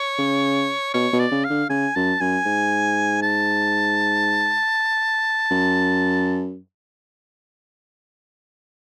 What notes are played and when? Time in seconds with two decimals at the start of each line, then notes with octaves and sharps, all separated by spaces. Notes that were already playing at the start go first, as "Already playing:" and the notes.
Already playing: C#5
0.18 C#3
0.94 B2 C#5
1.13 B2
1.19 D5
1.31 C#3
1.45 F5
1.50 D3
1.69 C#3 G#5
1.95 F#2 A5
2.21 F#2 G#5
2.46 G#2
3.23 A5
5.51 F#2